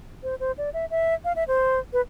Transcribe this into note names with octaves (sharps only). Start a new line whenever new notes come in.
C5
C5
D5
E5
E5
F5
E5
C5
B4